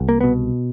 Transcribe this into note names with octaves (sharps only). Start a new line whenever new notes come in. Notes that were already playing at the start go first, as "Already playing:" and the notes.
Already playing: C2
A#3
B2 B3